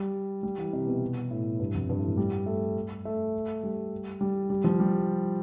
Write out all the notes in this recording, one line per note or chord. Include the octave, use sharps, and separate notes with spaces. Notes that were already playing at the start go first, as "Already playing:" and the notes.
Already playing: G3
G3
E3
C3
B2
A2
G2
F2
G2
A2
F3
G3
A3
A3
G3
G3
G3
F3
G3